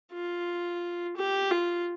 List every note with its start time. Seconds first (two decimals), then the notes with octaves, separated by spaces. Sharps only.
0.12 F4
1.16 G4
1.51 F4